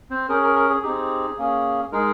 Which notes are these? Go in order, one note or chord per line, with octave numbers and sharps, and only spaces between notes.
C4 C5
C#4 G#4 A#4
A#4
A#4
G#4
C4 D#4 G4 G#4
A#3 C#4 G#4
G#3 D#4 G#4 A#4